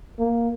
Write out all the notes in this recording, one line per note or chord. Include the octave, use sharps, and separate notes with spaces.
A#3